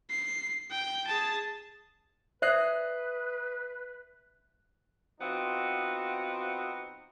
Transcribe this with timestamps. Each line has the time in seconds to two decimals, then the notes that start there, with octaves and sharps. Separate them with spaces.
0.10 C7
0.71 G5
1.07 G#4 A5
2.42 B4 C5 D5 E5 D#6 F#6 C7
5.20 F3 B3 C4 D#4 F#4